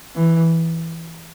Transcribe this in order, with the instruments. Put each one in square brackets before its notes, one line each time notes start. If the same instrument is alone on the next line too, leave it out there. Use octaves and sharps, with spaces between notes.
[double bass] E3